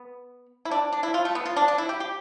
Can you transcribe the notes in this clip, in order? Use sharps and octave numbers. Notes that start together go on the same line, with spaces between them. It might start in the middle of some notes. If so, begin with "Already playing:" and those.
Already playing: B3
E4
D4
D4
E4
F4
A3
B3
F4
D4
D4
E4
G4
G4